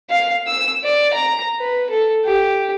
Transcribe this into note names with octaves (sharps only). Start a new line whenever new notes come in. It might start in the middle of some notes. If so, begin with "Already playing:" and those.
F5
E6
D5
A#5
B4
A4
G4